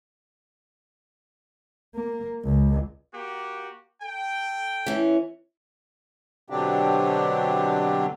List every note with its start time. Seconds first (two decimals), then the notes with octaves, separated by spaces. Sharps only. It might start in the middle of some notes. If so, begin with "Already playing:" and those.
1.95 A#3
2.44 C#2
3.14 A#3 F#4 G4
4.02 A4 G5
4.86 E3 C#4
6.50 B2 D3 F#3 C4 D4 G4